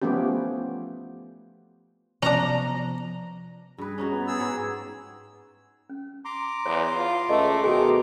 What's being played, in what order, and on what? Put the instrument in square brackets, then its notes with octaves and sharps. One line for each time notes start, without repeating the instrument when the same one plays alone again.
[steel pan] F3 A3 B3 C#4 G4
[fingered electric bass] C3 F3 B3 [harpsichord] C#4 D4 [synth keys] A#5
[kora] G2 B4 [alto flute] G#4
[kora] C#4 D#4 F#4
[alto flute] B3
[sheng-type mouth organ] G#4 E6
[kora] G#2 G4 C#5
[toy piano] C#4
[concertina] A#5 C6 D6
[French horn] E2 [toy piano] C#5
[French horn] F4
[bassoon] C#2 [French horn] A3 [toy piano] D#5
[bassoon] B2 [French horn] D#3 [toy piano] G#4 G#5